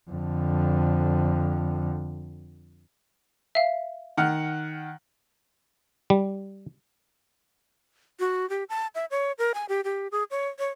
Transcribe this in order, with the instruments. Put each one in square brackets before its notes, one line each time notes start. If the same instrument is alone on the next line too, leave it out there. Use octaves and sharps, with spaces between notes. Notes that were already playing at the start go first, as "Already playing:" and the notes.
[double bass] F2 D3
[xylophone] E5 F5
[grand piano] D#3 F#5 F6
[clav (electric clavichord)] G3
[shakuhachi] F#4
G4
A5
E5
C#5
A#4
G#5
G4
G4
G#4
C#5
C#5